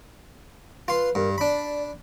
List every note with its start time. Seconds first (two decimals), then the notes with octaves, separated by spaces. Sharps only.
0.88 F4 B4 C6
1.15 G2 A#4
1.38 D4 D5 B5